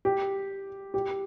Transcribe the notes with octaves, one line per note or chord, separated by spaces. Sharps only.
G4
G4